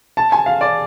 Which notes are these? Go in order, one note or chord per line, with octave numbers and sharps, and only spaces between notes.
A5
G#5
F5
D5